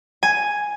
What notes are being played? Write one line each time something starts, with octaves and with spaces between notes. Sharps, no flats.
G#5